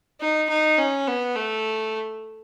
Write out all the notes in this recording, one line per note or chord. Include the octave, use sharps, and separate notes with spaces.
D#4
D#4
C#4
B3
A3